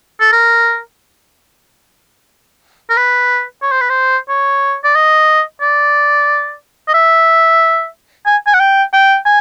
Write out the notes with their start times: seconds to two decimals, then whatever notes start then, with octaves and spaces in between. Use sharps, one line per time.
0.21 A4
0.32 A#4
2.90 A#4
2.97 B4
3.63 C#5
3.72 C5
3.81 B4
3.90 C5
4.29 C#5
4.84 D5
4.95 D#5
5.62 D5
6.88 D#5
6.94 E5
8.26 G#5
8.47 G#5
8.54 F#5
8.60 G5
8.93 G5
9.25 G#5